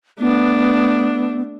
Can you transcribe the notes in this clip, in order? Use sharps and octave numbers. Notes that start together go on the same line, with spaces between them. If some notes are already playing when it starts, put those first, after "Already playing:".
A3 B3 D4